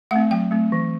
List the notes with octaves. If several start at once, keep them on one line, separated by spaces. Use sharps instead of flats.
A3 C4 F#5
F#3 G5
A3 C4
E3